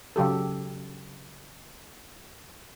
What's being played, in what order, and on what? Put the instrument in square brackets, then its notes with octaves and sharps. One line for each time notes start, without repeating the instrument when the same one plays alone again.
[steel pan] C#3 F#3 G4 A4